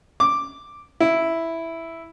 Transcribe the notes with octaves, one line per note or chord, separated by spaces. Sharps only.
D6
E4